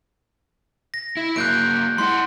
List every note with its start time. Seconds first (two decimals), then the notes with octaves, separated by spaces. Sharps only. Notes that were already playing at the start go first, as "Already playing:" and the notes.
0.94 A#6
1.17 E4
1.36 F#3 A#3 F#6 G6 D7
1.98 G3 E4 F#5 C6